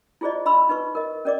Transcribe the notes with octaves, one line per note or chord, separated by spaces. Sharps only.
E4 F4 G#4 C5 D5 D#5
D#5 B5 C6 E6
D#4 B4 C#6
A#4 D#5
C#4 A#4 D5 D#5 D6